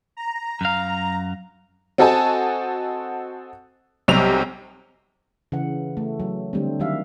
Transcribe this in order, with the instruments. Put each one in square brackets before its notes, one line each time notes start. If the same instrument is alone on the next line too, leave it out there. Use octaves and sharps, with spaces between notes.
[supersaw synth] A#5
[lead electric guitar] F#2 F5
[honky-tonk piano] C4 F#4 A4 D#5 G#5 A5
B1 C3 G3 F7
[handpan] C#3 E3 F#5
A3
F#3
D3 G3 A3 C4
D#3 F#3 G3 E5 F5